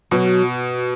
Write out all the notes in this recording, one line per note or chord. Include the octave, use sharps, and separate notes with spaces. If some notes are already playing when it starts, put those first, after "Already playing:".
B2 F#3